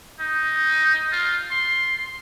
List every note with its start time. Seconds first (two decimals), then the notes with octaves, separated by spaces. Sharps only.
0.20 D#4
1.12 F4
1.51 C6